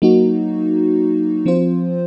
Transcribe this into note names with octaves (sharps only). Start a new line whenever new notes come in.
F#3 A#3 D#4 F#4
F3 C4 F4 C5